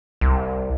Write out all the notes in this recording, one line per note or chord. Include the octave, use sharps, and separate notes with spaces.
C2